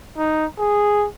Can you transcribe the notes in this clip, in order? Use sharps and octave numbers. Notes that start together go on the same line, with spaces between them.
D#4
G#4